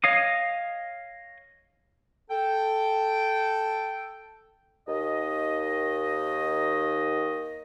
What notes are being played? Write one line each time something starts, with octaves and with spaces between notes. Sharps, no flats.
C#5 D#5 F5 D#6
A4 G5
D#2 D#3 D#5